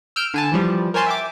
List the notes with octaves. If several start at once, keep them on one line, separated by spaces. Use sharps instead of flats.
E6 F6 G6 D7
D3 G#5 A5
E3 F3 G3
A#4 C5 C#5 G#5 A5 C6
E5 G5 D6